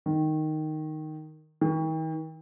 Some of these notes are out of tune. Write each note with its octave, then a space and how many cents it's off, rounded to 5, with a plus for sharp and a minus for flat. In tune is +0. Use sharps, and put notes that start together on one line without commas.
D#3 -5
D#3 +40